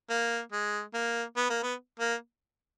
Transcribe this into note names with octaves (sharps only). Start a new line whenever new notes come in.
A#3
G#3
A#3
B3
A#3
B3
A#3